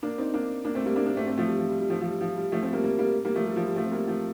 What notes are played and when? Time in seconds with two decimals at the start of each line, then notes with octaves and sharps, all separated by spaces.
0.03 A#3 D4
0.18 C4 D#4
0.34 A#3 D4
0.64 A#3 D4
0.75 A3 C4
0.85 G3 A#3
0.96 A#3 D4
1.06 A#3 D4
1.17 A3 C4
1.27 A3 C4
1.38 F3 A3
1.48 G3
1.59 F3
1.69 G3
1.80 G3
1.90 F3 A3
2.01 F3
2.06 G3
2.21 F3
2.36 G3
2.52 F3 A3
2.62 A3 C4
2.72 G3 A#3
2.83 G3 A#3
2.99 G3 A#3
3.25 G3 A#3
3.35 F3 A3
3.45 G3
3.56 F3
3.66 G3
3.77 F3 A3
3.85 C4
3.92 G3 A#3
4.08 F3 A3